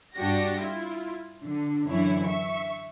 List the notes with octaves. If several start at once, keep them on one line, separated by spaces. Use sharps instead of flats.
G2 D4 F#4 G4 A#6
E4 F4
D3
F#2 D3 E3 E4 C#5
E5 C#6